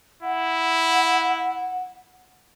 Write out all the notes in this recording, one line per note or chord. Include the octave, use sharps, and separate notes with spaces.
E4 F#5